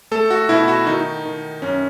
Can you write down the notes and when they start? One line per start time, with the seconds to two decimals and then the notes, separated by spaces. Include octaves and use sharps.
0.11 A3 A4
0.31 F#4
0.49 B2 E4
0.68 F#4
0.87 D#3 D#4
1.25 D#3
1.62 F#2 C#4